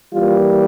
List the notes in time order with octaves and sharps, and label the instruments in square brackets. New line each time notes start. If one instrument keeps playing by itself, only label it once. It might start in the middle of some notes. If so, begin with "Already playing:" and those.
[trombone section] E3 G3 A#3 F4